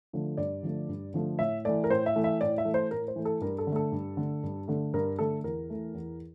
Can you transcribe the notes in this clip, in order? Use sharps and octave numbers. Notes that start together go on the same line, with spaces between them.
D3 F3 A3
G2 D5
D3 F3 A3
G2
D3 F3 A3
A2 E5
E3 A3 D5
A#4
A2 C5
E5
E3 A3
E5
A2 D5
E5
E3 A3
C5
A2 A#4
C5
E3 A3
A4
G2 A#4
A4
D3
A3 A4
G2
D3 A3
G2
D3 A3
G2 A#4
D3 A3 A4
E2 A#4
E3 A3
E2